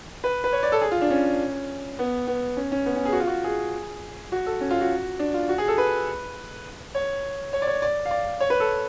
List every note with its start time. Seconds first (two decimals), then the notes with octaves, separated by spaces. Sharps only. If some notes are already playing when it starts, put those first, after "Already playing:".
0.24 B4
0.44 B4
0.53 C#5
0.63 D5
0.72 A4
0.82 G#4
0.92 F4
1.02 D4
1.10 C#4
1.99 B3
2.27 B3
2.57 C#4
2.72 C#4
2.86 B3
2.96 C#4
3.05 G#4
3.12 F#4
3.20 F4
3.27 F#4
3.44 G#4
4.32 F#4
4.46 A4
4.61 C#4
4.71 F4
4.81 F#4
5.19 D4
5.34 F4
5.49 F#4
5.58 G#4
5.68 A4
5.78 B4
6.95 C#5
7.53 C#5
7.62 D5
7.68 C#5
7.82 D5
8.05 F5
8.11 D5
8.41 C#5
8.50 B4
8.60 A4